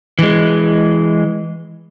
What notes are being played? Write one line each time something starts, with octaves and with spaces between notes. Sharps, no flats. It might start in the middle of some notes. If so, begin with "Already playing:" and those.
E3 G#3